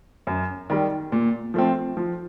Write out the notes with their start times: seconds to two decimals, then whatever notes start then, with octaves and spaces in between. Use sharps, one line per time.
0.27 F#2
0.70 D#3 G3
1.12 A#2
1.54 F3 A3 C4
1.97 F3